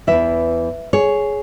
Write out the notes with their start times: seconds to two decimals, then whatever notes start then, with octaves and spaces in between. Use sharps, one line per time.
0.07 E2 E3 B4 E5
0.93 G#4 C#5